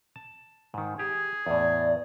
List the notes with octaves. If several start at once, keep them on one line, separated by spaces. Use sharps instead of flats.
A5
G#2 D#3
G4 G#4
E2 A2 D5